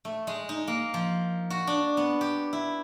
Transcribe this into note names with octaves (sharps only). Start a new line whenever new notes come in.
A3
G#3
D#4
A#3
F3
F#4
D4
B3
G4
E4